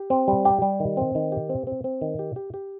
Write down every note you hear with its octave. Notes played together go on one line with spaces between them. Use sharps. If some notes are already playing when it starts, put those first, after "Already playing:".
Already playing: G4
C4
G3
G4
G3
D#3
C4
D#3
G4
C4
C4
C4
D#3
G4
G4
G4